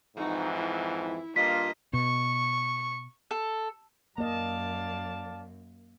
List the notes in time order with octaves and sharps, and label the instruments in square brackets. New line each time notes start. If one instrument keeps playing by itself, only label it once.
[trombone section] F2 G#2 E3 [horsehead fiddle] D#4 F#4
[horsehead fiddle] E4
[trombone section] G2 F4 [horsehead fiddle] A#3 D#5 [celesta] B6
[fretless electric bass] B2 [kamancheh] C#6
[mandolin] A4
[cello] F#2 [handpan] A#3 D#5 [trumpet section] D5 F5 A5